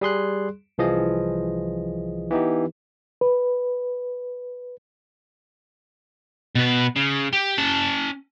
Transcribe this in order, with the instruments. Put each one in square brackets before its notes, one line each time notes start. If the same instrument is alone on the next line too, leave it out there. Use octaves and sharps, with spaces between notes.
[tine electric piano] G3 G#4 C6 F#6
C2 E3 F3 G#4 D#5
E3 B3 D#4 G4
[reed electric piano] B4
[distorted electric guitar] B2 B4
C#3
G4
C#4 A5